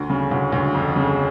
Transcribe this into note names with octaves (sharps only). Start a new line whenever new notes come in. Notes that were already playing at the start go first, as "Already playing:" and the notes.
Already playing: D2
C#3
D2
D2
F2
C#3